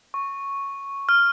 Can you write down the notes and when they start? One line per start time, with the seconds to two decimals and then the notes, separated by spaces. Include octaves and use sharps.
0.14 C#6
1.09 F6